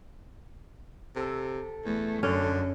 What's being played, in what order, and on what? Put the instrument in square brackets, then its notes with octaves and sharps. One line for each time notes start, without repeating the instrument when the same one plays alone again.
[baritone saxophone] C3 [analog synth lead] A4
[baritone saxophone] E2 [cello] A3
[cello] F#2 [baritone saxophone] D3 [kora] C#4